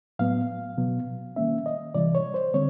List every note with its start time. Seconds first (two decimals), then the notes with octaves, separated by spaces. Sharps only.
0.19 A2 F#3 B3 F5
0.78 B2 F#3 B3
1.36 D#3 G3 A#3 C#4 E5
1.66 D#5
1.94 C3 E3 G3 D5
2.15 C#5
2.34 C5
2.54 D3 G3 C4 C#5